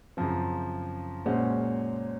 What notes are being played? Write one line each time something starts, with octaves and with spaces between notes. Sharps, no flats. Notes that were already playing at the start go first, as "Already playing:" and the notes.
F#2 C#3 F3 C4
A#2 G#3 C#4 F#4 C5